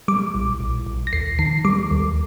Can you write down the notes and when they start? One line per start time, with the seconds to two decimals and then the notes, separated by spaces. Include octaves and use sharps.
0.08 G3 D6
0.35 A#1
0.60 A#1
0.86 A#1
1.07 A#6
1.13 D#2 C7
1.39 D#3 C7
1.65 G3 D6
1.91 D#2